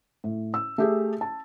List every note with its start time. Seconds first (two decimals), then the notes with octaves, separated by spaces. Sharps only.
0.24 A2
0.54 E6
0.78 A3 G4 G#4
1.21 A5